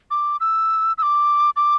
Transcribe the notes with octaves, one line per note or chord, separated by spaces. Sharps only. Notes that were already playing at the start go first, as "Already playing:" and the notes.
D6
E6
E6
D6
D6